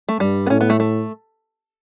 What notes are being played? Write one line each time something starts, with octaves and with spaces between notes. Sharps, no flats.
A3
G2 G3
B3
A2 C#4
B3
A3
A3